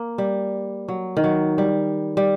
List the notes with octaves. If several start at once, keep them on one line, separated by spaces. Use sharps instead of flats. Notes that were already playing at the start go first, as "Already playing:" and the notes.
Already playing: A#3
G3
F#3
D#3
F#3
G3
G3